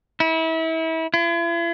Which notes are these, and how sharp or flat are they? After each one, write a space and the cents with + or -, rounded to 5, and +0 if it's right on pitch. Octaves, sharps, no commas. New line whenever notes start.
E4 -30
E4 +45